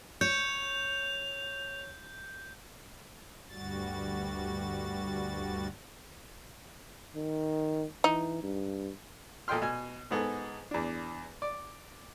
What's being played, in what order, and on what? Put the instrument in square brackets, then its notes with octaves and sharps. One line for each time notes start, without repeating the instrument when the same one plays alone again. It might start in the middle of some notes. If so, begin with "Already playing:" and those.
[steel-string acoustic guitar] C#5 [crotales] G6 [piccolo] F7
[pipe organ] D2 G2 G3 F#4 A6
[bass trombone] D#3
[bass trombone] E3 [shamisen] D#4
[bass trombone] G2
[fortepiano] A#2 A4 D#5 G5 C6 F6
B2 G#5
G#2 G#3 B3 G#4 A4
E2 D4
D5